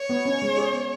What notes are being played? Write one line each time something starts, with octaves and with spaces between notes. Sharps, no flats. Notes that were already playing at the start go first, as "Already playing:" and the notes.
Already playing: C#5
B3
C#4
G#3
G#4
B3